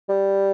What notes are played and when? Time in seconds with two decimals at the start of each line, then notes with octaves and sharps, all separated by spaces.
0.09 G3